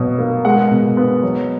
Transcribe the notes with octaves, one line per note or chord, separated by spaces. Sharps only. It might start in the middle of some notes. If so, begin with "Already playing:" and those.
Already playing: B2 F#3 B3
A#3
G#3 F#5
B2
B3
F#3